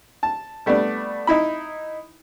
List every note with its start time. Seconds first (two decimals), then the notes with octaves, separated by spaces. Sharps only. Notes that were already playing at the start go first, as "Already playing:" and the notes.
0.23 A5
0.66 G3 A3 B3 D4 D5
1.27 D#4 E4 B5